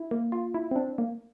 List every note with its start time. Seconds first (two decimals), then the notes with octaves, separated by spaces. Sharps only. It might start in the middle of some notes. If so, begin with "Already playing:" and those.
Already playing: E4
0.11 A#3
0.32 F4
0.54 E4
0.71 C4
0.76 D4
0.98 A#3